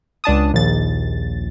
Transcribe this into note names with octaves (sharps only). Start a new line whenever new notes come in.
C#2 D4 A5 D#6
A#1 D#2 A6